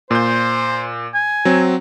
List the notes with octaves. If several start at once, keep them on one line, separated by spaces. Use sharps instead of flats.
A#2 C5 G6
G#5
F#3 C4